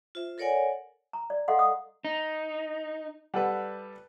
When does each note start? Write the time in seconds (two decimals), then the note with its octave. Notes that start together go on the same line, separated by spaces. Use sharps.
0.15 F4 C5 E5
0.38 A4 A#4 C#5 D5 F#5 G#5
1.13 A#5
1.30 D5
1.48 A4 D#5 F5 F#5 C6
1.59 D#6
2.05 D#4
3.34 G3 A4 B4 F#5